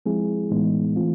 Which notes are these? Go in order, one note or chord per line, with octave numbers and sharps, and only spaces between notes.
F3 G#3 C4 E4 G#4
A2 E3 G#3 B3 D#4
E3 A3 C4 F4